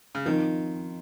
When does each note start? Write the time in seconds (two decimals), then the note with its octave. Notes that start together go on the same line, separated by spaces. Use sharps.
0.15 C#3
0.25 D#3 F3 C4 D#4